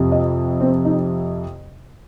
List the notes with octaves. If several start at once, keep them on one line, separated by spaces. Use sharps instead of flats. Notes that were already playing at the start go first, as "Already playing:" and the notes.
Already playing: F2 C3 F3
D#5
C4
D#4